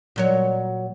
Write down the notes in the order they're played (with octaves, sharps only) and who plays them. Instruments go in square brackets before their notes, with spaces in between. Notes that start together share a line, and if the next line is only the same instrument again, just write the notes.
[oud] A#2 F#3 C#5